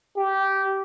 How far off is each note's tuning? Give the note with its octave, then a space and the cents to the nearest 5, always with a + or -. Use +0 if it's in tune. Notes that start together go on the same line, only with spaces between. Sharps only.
G4 -15